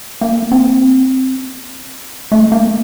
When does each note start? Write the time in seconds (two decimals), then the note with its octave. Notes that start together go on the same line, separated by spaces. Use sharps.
0.21 A#3
0.52 C4
2.32 A3
2.52 A#3